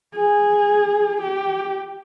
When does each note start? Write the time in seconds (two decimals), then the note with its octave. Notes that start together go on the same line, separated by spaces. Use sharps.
0.16 G#4
1.21 G4